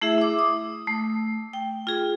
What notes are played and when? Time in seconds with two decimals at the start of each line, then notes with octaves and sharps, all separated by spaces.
0.01 A3 E4 G#4 E5
0.18 E4 D6
0.39 D#6
0.87 A3
1.53 G5
1.87 F4 G#4